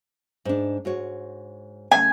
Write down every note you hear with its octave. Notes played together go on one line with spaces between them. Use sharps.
G#2 D4
G#2 F#4 C#5
C#3 A3 G#5